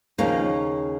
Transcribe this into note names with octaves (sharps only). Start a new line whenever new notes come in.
D#2 C#3 F3 A#3 C#4